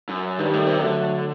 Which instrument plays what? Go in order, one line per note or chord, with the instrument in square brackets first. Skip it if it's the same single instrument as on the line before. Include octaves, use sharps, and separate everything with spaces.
[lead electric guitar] F#2
[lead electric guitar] G2 [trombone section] D#3 G3
[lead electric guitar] A2
C3
[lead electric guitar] D3 [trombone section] F#3 A3